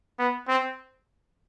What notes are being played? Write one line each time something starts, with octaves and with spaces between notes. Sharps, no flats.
B3
C4